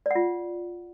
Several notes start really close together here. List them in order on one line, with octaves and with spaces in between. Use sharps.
D5 F#5 F4